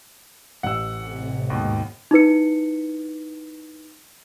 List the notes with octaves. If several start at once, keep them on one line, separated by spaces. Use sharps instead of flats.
A1 F#5 E6
A2 C3
D#2 G#2 B2
D#4 E4 B4 C#7